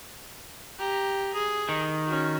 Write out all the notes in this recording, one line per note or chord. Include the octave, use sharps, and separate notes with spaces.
G4 A#5
G#4
D#3
C#4 F#4